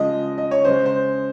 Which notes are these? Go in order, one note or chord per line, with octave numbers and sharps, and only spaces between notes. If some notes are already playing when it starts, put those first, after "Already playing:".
Already playing: C#3 F3 G#3 D#5
D#5
C#5
C#3 G#3 C5
C5